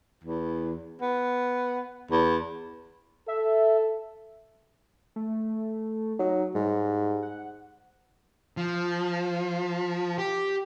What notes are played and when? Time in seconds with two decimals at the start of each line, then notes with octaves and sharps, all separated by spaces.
0.23 E2
1.01 B3
2.11 E2
3.28 A4 E5
5.16 A3
6.19 F#3 D#4
6.55 G#2 G3
7.23 F#5
8.57 F3
10.18 G4